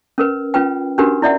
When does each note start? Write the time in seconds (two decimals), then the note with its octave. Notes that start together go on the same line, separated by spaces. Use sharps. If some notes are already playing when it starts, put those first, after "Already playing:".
0.18 C#4 A#4 B4
0.54 C#4 F4 B4 G5
0.98 C#4 D4 F#4 G4 A#4 B4
1.22 E4 D5 E5 F#5